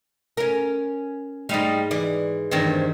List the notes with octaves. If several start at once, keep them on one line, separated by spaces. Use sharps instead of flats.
C#4 A#4
G#2 G3 D#4 F5
E3 D5
E2 G2 D#3 C4 C5